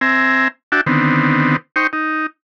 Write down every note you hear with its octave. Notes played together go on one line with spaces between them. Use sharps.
C4 E5 G#5 A#5
D4 F#4 E5 G5 A5
D3 D#3 B3 C4
D#4 C5 G5 C#6
D#4